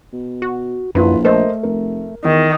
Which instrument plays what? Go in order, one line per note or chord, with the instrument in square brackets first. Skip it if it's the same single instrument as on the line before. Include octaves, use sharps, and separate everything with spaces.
[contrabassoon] B2
[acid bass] F#4
[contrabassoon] A#1 [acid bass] F#2 [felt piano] E4 F4 B4
[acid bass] A3 [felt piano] A#4 C5 D#5
[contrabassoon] F1 [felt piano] A#4
[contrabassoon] E2 [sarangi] D#3